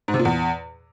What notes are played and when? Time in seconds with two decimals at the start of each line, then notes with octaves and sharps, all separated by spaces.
0.08 G#2
0.14 C3
0.19 A#2
0.25 E2